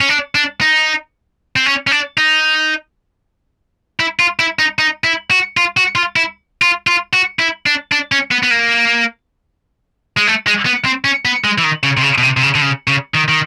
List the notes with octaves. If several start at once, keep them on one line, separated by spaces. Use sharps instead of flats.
C#4
D4
D4
D#4
C4
C#4
C#4
D4
D#4
E4
F4
E4
D#4
D#4
E4
F#4
F4
F#4
F4
E4
F4
F4
F#4
E4
D4
D4
C#4
B3
B3
A#3
G#3
A3
G#3
B3
C4
C#4
B3
G#3
E3
D#3
C#3
C3
C#3
B2
C3
C3
C#3
D3
C#3
C#3
D#3
D#3